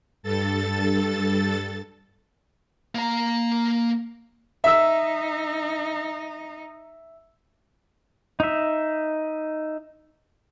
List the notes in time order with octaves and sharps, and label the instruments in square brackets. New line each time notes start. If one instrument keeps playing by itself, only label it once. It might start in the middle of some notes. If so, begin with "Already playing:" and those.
[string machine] G2 A4 A6
[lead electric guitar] A#3 A#5
[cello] D#4 [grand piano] E5 E6
[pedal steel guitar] D#4 E5